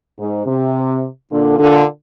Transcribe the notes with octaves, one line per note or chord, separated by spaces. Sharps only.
G#2
C3
A#2 D3
A#2 D3